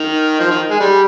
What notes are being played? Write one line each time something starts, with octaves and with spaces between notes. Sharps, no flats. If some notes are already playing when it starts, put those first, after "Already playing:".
Already playing: D#3
F3
D#3
G#3
G3